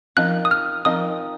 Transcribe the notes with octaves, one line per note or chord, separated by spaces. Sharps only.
F3 C4 D#4 A#4 D#5 F#6
D#6
F6
F3 C4 D#4 A#4 D#5 D#6